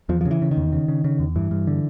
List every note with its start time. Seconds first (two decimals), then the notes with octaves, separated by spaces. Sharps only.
0.09 E2 F3
0.21 C#3 F3
0.31 E3
0.42 C#3
0.51 D#3
0.57 E2
0.72 C#3
0.88 C#3
1.04 C#3
1.19 E2
1.36 G2 E3
1.51 G2
1.67 D3